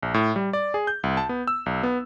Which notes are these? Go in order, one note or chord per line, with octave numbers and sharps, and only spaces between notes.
A#1
A2
G3
D5
G#4
G6
C2
A5
B3
E6
B1
B3